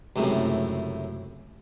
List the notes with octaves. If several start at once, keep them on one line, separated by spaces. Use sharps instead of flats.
C#2 F#2 A2 C3